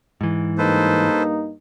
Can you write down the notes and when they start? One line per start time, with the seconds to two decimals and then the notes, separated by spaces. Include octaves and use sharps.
0.21 G#2 E3
0.58 G2 A#3 D#4 A4 B4 C5